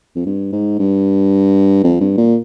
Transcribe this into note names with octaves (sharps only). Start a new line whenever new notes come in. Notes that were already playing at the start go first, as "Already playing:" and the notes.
F2
G2
G#2
G2
F2
G2
A#2